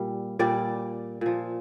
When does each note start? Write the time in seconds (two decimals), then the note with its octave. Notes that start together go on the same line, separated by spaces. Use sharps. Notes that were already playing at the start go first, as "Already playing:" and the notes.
Already playing: A#2 G3
0.39 A#2 G3 D5
1.21 A#2 F3